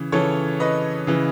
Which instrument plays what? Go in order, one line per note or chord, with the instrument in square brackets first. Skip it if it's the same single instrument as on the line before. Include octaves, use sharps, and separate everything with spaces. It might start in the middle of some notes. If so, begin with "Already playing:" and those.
Already playing: [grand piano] C#3 E3
C#3 E3 A4 C#5
B4 D#5
C#3 E3